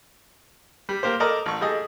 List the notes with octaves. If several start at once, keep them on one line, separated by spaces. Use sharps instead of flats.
G3
A#3 G4 C5
A4 A#4 D5 D#5 A#5
A1 C#6
G3 G#4 A4 D#5